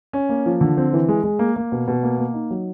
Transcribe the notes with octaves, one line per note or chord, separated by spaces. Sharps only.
C#4
A#3
F3
D3
C4
E3
G#3
G#3
A#3
A#3
B2
B2
A#3
A#3
D#4
F#3